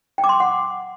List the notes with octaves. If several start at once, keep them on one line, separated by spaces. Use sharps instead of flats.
G5
D6
C6
D6
F#5